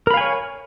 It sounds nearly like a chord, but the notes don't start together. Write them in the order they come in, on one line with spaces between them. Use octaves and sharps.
A#4 B5 F5 G#5 C#5